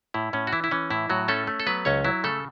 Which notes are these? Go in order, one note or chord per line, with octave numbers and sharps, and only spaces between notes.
A2 E4
A2 C#4
F#4
E3 E4
E4
E3 C#4
A2 E4
A2 F#3 F#4
A3 C#4 A4
A3
A4
F#3 B3 B4
C#2 C#4 C#5
F#3 E4
C#3 A3 A4